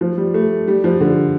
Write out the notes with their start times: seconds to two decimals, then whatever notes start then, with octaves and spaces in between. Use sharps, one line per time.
0.01 F3
0.18 G3
0.34 A3
0.68 G3
0.84 F3
1.01 D3